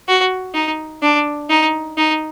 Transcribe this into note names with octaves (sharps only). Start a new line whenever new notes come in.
F#4
D#4
D4
D#4
D#4